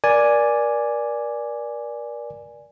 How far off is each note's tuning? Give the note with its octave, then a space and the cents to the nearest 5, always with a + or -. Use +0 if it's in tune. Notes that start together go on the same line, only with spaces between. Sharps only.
A#4 +30 D5 +0 G#5 +0